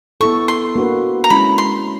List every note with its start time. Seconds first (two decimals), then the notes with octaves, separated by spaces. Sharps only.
0.21 B3 E4 A4 C#6
0.48 C6
0.76 A#3 D4 F#4 B4
1.24 A#5
1.30 G#3 C#4 E4 B5
1.58 C6